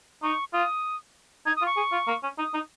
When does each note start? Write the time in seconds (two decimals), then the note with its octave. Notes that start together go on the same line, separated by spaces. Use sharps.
0.23 D#4 C#6
0.53 F4 D#6
1.46 D#4 G#6
1.56 D#6
1.61 F4
1.66 C#6
1.77 G#4
1.92 F4
2.07 A#3
2.23 C#4
2.38 D#4 D#6
2.54 D#4